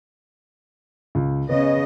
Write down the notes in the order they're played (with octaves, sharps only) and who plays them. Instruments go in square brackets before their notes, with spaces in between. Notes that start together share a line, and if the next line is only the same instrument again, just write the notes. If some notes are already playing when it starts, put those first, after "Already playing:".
[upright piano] C#2
[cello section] C#3 D#5 [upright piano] B3